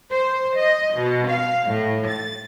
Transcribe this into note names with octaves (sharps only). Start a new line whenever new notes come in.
C5
D#5
B2
F5
A2
A6